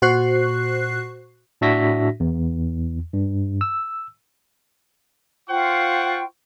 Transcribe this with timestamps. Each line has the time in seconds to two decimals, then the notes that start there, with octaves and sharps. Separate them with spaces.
0.02 A#2 F#4 C5 C#6 F#6 C7
1.61 A2 D4 F#4 E5 A#6 B6
2.20 E2
3.13 G2
3.61 E6
5.49 F4 C5 F#5 G5 C#6